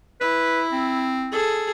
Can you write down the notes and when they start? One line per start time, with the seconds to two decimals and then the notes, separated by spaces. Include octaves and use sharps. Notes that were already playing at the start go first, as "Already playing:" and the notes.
0.21 E4 B4
0.72 C4
1.31 G#4 A4